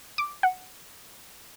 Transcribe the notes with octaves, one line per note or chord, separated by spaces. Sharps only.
D6
F#5